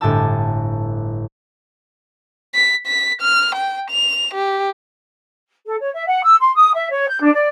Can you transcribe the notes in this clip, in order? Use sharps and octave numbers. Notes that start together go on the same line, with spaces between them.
G1 A2 G4 G#5 A5 E6
B6
B6
F6
G5
F7
G4
A4
C#5
E5
F#5
E6
C6
D#6
E5
C#5
G6
D4
D5